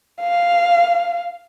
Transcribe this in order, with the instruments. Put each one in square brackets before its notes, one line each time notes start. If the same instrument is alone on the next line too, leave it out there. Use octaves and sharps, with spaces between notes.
[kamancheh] F5